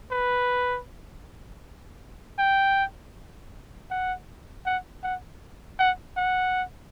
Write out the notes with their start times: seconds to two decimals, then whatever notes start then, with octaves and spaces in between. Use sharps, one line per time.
0.11 B4
2.39 G5
3.91 F#5
4.66 F#5
5.04 F#5
5.79 F#5
6.17 F#5